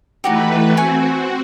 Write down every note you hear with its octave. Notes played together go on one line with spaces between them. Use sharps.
E3 A3 D#4 F#4 G4 B4
C4 F#4 G#5 C#6